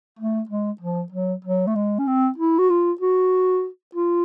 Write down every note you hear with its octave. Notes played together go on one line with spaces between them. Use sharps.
A3
G#3
F3
F#3
F#3
A3
G#3
C#4
C4
E4
F#4
F4
F#4
F4